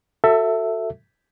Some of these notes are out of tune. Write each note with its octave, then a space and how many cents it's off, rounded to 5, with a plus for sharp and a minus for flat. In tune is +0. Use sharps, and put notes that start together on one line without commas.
F#4 +0 A4 +25 E5 +0